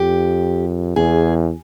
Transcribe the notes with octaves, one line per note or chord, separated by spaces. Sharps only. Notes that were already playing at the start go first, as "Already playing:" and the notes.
Already playing: F2 G4
E2 G#4